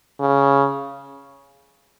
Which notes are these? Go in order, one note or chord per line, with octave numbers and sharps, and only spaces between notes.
C#3